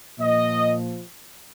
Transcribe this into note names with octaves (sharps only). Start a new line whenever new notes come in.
A#2 F3 D#5